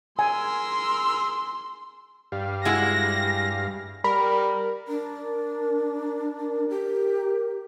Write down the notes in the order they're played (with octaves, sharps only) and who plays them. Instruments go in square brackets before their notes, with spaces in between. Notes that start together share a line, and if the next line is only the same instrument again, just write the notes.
[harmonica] G#4 A#4 E6 [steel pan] G#5 [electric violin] C6
[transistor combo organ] G2 F5 [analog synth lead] G3
[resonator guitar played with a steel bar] G#3 E4 F#4 [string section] A#6
[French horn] G3 [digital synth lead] A#4 [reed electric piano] B5
[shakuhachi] D4 [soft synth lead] A#4
[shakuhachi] G4